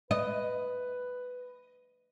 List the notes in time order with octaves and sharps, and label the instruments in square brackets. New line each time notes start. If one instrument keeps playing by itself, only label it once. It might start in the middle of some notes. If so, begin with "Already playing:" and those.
[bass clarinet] B4 [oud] D#5